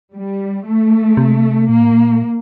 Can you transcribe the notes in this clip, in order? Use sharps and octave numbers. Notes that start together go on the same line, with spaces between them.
G3
A3
C3
A#2 A#3
A2
A#2